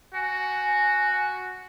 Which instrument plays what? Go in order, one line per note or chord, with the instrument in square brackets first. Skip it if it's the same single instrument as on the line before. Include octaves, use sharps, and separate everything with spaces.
[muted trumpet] F#4 [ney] G#5